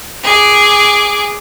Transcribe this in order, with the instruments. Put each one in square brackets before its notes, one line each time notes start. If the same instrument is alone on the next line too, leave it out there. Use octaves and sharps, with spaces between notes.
[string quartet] G#4 D6